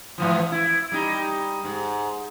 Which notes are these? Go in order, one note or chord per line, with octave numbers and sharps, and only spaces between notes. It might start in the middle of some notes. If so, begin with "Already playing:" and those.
G#2 E3 F3
E4
G3 D#4
G#2